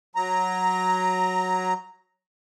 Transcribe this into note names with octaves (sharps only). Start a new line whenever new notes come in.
F#3 A#5